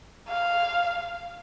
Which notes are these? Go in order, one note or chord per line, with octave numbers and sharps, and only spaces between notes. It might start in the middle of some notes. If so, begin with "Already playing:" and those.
F5